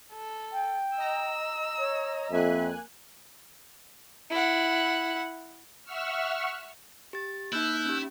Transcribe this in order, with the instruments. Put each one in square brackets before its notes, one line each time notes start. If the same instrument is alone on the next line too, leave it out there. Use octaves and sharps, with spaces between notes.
[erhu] A4
[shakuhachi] G5
[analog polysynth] D#5 A#5 [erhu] E6
[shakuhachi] C#5
[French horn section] F2 [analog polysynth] A#3 G#5 F#6 [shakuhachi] E5
[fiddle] E4 F#5
[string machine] E5 F#5 C#6 E6 F6
[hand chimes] G4 A6
[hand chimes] A#3 D#4 [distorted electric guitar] E4 [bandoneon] E6 F#6 G6
[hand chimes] C#4 G4